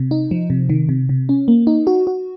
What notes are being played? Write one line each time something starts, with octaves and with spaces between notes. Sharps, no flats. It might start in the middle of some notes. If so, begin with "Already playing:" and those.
Already playing: C3
D#4
F3
C3
D#3
C3
C3
C#4
A#3
D#4
F#4
F#4